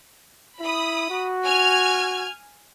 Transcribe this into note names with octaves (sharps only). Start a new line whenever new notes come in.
E4 B5 D#6
F#4
G#5 F6 G#6